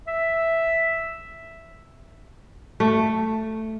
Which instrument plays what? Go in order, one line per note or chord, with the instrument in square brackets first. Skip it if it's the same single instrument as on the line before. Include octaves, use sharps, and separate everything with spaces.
[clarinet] E5
[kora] A3